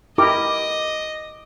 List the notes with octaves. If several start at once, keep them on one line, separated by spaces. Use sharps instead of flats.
E4 G4 A#4 D#5 D6